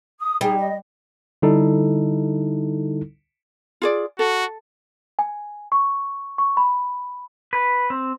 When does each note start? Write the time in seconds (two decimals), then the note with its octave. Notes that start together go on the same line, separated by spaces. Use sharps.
0.20 D#6
0.41 G3 D#4 G#4
0.57 D#5
1.42 D3 G3 D#4 E4 A4
3.82 F4 G#4 D5
4.19 F#4 A4
5.19 G#5
5.72 C#6
6.38 C#6
6.57 B5
7.53 B4
7.90 C4